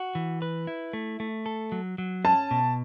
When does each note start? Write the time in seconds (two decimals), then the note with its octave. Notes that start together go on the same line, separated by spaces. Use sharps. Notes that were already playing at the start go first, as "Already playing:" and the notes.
Already playing: F#4
0.15 E3
0.42 B4
0.67 E4
0.93 A3
1.20 A3
1.46 A4
1.72 F#3
1.98 F#3
2.25 C#4 A5
2.51 B2